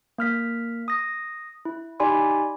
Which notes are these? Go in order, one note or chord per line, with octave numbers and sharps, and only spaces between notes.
A#3 F6 B6
D#6 A#6
E4
D#4 G4 D5 G#5 B5 C6